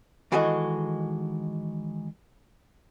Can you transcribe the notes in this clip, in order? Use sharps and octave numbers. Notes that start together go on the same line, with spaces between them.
D#3 E3 G#3 F#4 A4 D#5